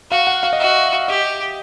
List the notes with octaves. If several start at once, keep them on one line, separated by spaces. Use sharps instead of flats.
F#4 F5
F#5
F5
D#5
F#4 E5
G4 D#5